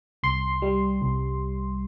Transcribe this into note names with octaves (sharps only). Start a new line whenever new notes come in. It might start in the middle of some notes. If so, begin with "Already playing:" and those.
C2 C6
G3
C2